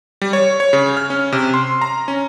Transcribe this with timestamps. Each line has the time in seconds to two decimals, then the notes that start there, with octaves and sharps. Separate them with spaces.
0.22 G3
0.33 C#5
0.60 C#5
0.73 C#3
0.97 F6
1.10 C#4
1.32 C3
1.54 C6
1.81 A#5
2.08 C#4